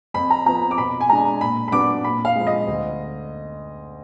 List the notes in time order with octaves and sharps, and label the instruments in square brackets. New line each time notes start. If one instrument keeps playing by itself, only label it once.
[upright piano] F2 B5
A#5
F3 B3 A#5
D6
B2 B5
G#5
G#3 D4 A#5
A#2 B5
B5
F#3 B3 D4 D6
A#2 B5
F5
F3 G#3
D#5
D2